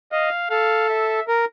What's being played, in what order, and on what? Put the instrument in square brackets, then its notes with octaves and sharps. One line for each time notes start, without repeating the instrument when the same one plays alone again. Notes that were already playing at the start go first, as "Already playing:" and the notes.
[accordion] D#5 [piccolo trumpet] F5
[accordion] A4 [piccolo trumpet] F5
[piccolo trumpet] E5
[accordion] A#4